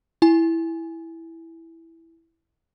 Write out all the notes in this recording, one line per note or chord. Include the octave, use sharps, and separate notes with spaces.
E4 G#5